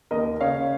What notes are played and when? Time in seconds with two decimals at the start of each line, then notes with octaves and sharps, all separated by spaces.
0.11 D#2 A#4 D#5
0.41 C#3 C#5 F5